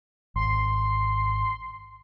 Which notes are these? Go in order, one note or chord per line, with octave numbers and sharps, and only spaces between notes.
G#1 C6